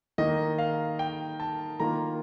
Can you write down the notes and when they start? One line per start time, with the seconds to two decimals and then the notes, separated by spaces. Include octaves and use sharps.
0.18 D#3 A#3 D#4 D#5
0.58 F5
0.99 G5
1.40 A5
1.80 D#3 A#3 F4 A#5